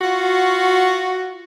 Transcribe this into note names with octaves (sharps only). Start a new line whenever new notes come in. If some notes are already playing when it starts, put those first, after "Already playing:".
F4 F#4